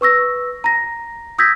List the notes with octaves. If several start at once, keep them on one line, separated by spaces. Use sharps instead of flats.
B4 C#6 E6 A#6
A#5 A#6
D#6 E6 G6 G#6 A#6 B6